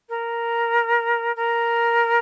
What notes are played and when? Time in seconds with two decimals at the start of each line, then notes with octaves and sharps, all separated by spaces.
0.09 A#4
1.36 A#4